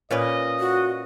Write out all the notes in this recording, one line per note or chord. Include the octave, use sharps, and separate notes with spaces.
A#2 C#4 B4 D#5
F#4